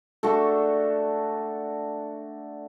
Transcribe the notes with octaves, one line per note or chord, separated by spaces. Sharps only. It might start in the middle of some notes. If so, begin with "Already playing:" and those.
A3 D4 F#4 A4